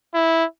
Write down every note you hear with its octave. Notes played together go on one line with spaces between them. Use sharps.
E4